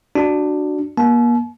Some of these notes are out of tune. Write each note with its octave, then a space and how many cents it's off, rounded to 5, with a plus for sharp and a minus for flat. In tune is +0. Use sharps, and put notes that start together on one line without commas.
D4 +10 F#4 +0
A#3 +35 A5 -45